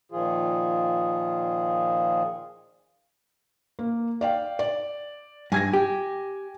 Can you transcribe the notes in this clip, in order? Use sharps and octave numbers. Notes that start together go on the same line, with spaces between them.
A#2 D#3 F3 F4 G#4
A#3
D5 F5 G5
D5
G2 G#5 G#6 A#6
G4